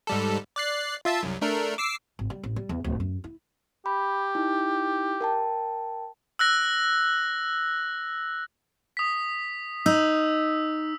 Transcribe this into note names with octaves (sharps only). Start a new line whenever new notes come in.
G#2 G3 A4
D5 F#6 C7
F4 E5 A5
C2 F#2
A3 D4 A#4
D6 E6 C7
G#1
G3
A1
G3
E2
D1
F#2
E4
G4 B5
D#4 E4
A#4 G5 A5
E6 F#6 A#6
D#6 B6
D#4 E6